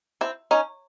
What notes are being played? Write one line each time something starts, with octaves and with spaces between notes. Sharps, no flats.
C4 E4
C#4 D#4